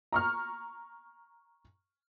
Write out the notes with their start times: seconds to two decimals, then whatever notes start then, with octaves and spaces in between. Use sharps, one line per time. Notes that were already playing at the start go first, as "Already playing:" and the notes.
0.12 A#5 C#6 F6